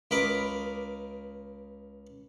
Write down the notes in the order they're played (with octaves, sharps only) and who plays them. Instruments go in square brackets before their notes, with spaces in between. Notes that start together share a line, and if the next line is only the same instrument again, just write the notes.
[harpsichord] C#2 A#4 B4 D#5 B5 D6